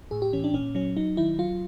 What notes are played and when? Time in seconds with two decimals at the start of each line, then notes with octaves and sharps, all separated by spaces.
0.11 A2 G#4
0.22 G4
0.33 E3 C#4
0.44 D4
0.54 A#2 C#4
0.75 F#3 C#4
0.97 F#3 D#4
1.17 D#3 E4
1.39 F#3 F4